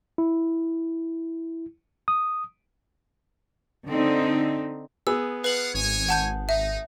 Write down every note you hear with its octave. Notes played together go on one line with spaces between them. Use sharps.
E4
D#6
D3 C4 D#4
B3 G#4 E6
F4 B4 F5 F#5 F#7
G#1 C#5 G#5
F#5 A5 G6
D#4 E5